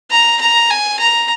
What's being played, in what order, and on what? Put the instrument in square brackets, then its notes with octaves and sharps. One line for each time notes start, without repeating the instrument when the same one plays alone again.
[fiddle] A#5
A#5
G#5
A#5